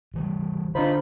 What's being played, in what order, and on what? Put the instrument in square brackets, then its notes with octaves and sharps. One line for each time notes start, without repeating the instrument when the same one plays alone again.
[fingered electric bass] A1 E3 G3
[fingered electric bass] D3 [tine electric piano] D4 C5 [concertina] D#4 F4 B5